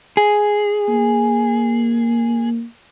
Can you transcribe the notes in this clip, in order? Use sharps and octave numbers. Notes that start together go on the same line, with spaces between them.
G#4
A#3